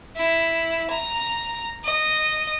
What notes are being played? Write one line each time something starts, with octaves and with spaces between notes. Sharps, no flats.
E4
A#5
D#5